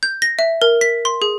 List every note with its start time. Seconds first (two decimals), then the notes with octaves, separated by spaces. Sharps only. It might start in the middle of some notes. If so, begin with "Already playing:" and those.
0.03 G6
0.22 A#6
0.39 E5
0.62 A#4
0.81 B6
1.05 C6
1.22 G#4